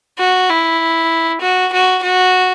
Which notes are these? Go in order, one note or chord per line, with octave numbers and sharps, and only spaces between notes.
F#4
E4
F#4
F#4
F#4